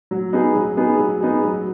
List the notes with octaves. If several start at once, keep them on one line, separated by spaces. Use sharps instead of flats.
F#3
B3 D#4 G#4
F#3
B3 D#4 G#4
F#3
B3 D#4 G#4
F#3